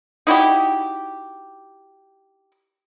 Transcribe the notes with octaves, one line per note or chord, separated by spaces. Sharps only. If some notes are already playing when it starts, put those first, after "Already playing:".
D#4 E4 F#4 G4